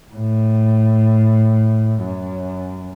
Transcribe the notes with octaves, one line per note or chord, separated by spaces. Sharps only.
A2
F#2